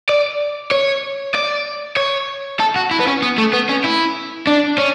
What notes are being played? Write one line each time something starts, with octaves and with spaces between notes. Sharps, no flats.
D5
C#5
D5
C#5
A4
F#4
E4
B3
C#4
B3
A3
B3
C#4
E4
D4
C#4